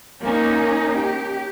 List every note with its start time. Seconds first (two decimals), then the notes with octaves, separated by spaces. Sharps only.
0.21 A#3 C#4 D#4
0.98 G4